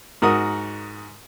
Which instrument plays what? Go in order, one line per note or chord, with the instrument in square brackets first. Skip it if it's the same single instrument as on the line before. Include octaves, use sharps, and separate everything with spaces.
[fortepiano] G#2 F#4 A#4 D#6